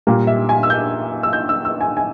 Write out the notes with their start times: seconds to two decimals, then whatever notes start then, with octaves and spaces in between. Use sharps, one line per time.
0.07 A#2 G3 A#3
0.27 E5
0.49 G#5
0.63 E6
0.70 G6
1.23 E6
1.33 G6
1.49 E6
1.65 E6
1.81 G#5
1.97 G#5